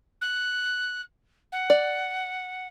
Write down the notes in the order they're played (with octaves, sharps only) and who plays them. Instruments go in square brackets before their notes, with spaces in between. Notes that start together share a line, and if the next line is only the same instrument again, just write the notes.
[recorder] F#6
F#5
[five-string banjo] D5